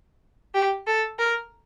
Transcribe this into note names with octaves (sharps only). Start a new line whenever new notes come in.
G4
A4
A#4